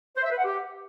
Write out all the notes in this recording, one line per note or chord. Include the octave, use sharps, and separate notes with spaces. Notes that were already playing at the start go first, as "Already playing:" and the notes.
C5
E5
B4
F#5
G4